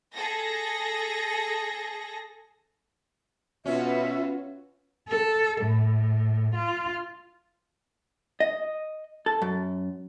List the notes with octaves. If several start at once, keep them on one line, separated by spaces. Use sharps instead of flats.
G#4 A4 A#6
B2 C#4 F4 F#4 B4 E5
A4
A2
F4
D#5
A4
F#2